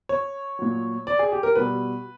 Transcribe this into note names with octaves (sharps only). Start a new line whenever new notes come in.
C#5
A#2 F#3
D5
G#4
G4
A#4
B2 G3 B4